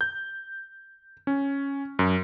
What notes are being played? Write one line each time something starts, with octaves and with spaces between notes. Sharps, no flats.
G6
C#4
F#2